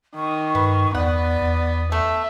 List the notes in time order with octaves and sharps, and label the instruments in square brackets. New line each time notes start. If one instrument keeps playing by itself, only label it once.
[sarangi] D#3 [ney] C#6
[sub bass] G2 [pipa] B4
[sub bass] E2 [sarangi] B3 [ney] D5 [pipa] F#5
[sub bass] E2
[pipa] A3 [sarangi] E5